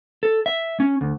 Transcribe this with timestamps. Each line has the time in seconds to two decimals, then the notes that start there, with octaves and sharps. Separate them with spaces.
0.23 A4
0.46 E5
0.80 C#4
1.01 D2